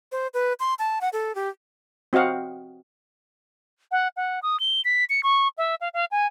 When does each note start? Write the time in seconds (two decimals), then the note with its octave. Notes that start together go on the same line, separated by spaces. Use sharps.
0.12 C5
0.34 B4
0.60 C6
0.79 A5
1.01 F#5
1.13 A4
1.35 G4
2.13 C4 F#4 D#5 F5 F#5
3.91 F#5
4.17 F#5
4.43 D#6
4.60 G7
4.85 B6
5.10 C#7
5.23 C#6
5.58 E5
5.81 F5
5.94 F5
6.11 G#5